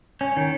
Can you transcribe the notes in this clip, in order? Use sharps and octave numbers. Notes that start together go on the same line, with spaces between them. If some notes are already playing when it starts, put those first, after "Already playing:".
C#4
D#3